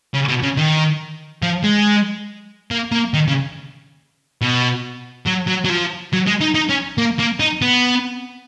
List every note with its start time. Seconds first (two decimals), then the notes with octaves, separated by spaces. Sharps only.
0.14 C#3
0.29 B2
0.43 C#3
0.57 D#3
1.43 F3
1.64 G#3
2.71 A#3
2.92 A#3
3.14 D#3
3.28 C#3
4.42 B2
5.27 F#3
5.48 F#3
5.65 F#3
5.70 F3
6.13 F#3
6.27 G#3
6.41 D#4
6.55 D#4
6.69 C#4
6.98 A#3
7.19 A#3
7.40 D#4
7.62 B3